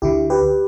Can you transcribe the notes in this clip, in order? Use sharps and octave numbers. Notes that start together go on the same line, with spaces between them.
D2 D3 E4 G4
G4 B4